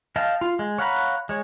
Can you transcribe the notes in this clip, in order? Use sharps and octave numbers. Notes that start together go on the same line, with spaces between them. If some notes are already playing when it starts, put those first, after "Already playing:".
D#5 F5 G5 A5
F4
G#3
C#5 F5 F#5 A#5 B5
G#3 C#5